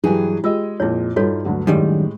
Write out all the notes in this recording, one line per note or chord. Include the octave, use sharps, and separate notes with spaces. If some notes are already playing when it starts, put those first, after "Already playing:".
G2 E3 F#3 G4 G#4
G#3 F4 G4 G#4 D#5 E6
F2 A#2 E4 C#5
G2 D#4 F4 F#4 A4 C#5
D2 D3 F#3
F#2 A2 D#3 G3 G#3 G4